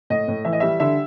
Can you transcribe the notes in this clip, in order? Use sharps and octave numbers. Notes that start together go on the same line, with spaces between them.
A2 D#5
A2
E3 E5
D#5
G3 E5
D3 E5